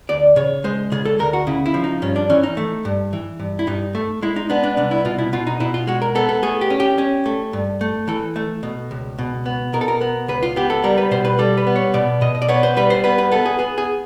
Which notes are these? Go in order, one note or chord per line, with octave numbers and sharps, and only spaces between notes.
D2 D5
C#3 C#5
G#3 C5
C#3 G#4
A4
D2 A#4
F#4
C#3 E4
E4
F3
D#4
G2 C#4
D4
E3 C#4
D#4
A3
G2
E3
G2
E4
G2 D#4
A3
G#3 E4
D#4
B3 D4
D4
C2 D4
E4
B2 F4
E4
B2 F4
D#4
B2 E4
F4
G#3 F#4
A#4
B3 A4
A4
A3 G#4
G4
C#4
G4
C#4
A3
G2
A3
E3 A4
A3
B2
C#2
B2
B3
B2 A#4
A4
A#4
B3
C#2 B4
F4
B3 G4
A4
G3 A#4
B4
B2 C5
B4
G3 A4
B4
B3
C#5
B2 D5
B2 D#5
D#5
D5
B3 C#5
C5
G3 B4
C5
B3 B4
B4
B3 A4
G#4
B3 G#4
G#4